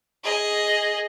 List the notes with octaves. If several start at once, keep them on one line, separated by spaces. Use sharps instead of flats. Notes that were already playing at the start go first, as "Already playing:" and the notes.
G#4 D#5